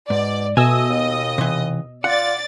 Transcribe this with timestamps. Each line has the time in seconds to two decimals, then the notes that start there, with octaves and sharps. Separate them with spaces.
0.10 G#2 B2 D5
0.57 B2 A3 D#5 G#5 E6
0.89 D#2
1.38 C3 E3
2.04 F4 D5 F#5 A6